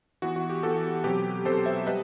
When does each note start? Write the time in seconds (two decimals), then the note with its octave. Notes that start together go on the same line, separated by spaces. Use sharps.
0.22 E3 B3 F#4
0.36 F#4
0.50 G4
0.63 E3 B3 F#4 A4
1.04 B2 F#3 C4 G4 B4
1.45 B2 F#3 C4 A4 C5
1.66 C5 E5
1.86 G3 B3 B4 D#5